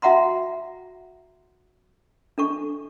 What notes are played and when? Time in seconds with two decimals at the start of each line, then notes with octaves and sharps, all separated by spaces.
0.02 F#4 E5 F#5 A#5 C6
2.38 D4 A4 C#6